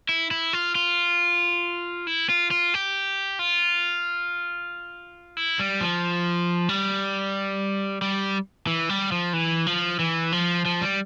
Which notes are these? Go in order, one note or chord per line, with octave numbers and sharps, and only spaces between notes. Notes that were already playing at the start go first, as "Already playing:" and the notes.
E4
E4
F4
F4
E4
F4
F4
G4
F4
E4
G3
F3
G3
G3
E3
G3
F3
E3
F3
E3
F3
F3
G3